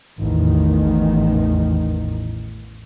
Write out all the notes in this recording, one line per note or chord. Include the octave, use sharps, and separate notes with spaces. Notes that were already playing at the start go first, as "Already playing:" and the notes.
A1 E2 D#3